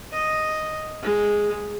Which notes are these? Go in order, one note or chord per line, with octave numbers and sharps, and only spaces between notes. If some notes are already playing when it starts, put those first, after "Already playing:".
D#5
G#3